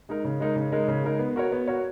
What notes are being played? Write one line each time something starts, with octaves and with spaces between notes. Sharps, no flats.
G#3 D#4 A#4
C#3
G#3 D#4 A#4
C#3
G#3 D#4 A#4
C#3
G#3 D#4 A#4
B3
F#4 A#4 C#5
B3
F#4 A#4 C#5